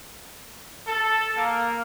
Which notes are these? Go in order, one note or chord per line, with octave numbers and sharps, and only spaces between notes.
A4
A#3